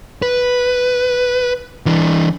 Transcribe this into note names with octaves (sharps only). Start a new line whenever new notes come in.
B4
E3 D4